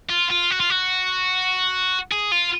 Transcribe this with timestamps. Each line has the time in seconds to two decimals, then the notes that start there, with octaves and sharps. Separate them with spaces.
0.09 F4
0.30 F4
0.50 F#4
0.60 F4
0.70 F#4
2.12 G#4
2.32 F4